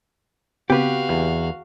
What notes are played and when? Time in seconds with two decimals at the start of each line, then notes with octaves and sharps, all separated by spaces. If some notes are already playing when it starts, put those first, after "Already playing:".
0.70 C#3 B3 C4 F#4 G4 B4 F5
1.09 E2